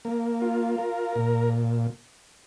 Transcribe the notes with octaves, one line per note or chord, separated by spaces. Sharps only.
A#3
F4
A#4
A#2